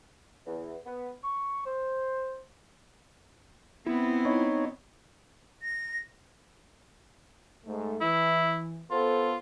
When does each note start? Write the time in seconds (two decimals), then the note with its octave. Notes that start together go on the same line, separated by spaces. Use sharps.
0.46 E2
0.86 B3
1.24 C#6
1.65 C5
3.86 B3 C4 E4
4.25 D#4 C#5
5.61 A#6
7.65 G#2 A3
8.01 E3 E4
8.91 B3 F4 A4 C5